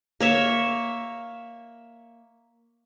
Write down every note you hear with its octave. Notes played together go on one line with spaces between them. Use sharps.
A#3 C#5 E5